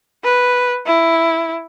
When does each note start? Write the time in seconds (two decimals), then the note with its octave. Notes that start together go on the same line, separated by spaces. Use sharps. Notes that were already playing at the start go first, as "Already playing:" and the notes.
0.24 B4
0.86 E4